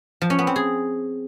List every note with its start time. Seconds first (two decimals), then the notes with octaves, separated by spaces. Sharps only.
0.21 F3
0.30 C#4
0.39 B3
0.47 C4
0.56 G#4